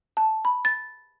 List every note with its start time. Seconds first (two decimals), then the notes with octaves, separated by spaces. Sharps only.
0.17 A5
0.45 B5
0.65 A6